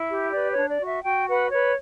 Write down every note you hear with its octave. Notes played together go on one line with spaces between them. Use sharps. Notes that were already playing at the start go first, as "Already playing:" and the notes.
Already playing: E4 E5
G4
B4 D5
C#5
D4
D5
F#4
E5
F#4 G5
B4 F#5
B4 C#5